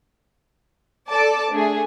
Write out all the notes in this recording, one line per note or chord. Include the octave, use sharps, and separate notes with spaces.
A4 D5 A5 D6
A3 D4 G#4